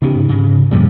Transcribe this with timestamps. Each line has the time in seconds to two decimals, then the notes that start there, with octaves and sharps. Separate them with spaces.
0.02 C#3 B3 D#4 G4
0.16 G#2
0.29 C#3
0.71 F#2 A#2 C#3 F3 G3